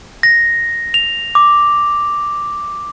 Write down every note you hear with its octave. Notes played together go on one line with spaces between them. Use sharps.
A#6
F7
D6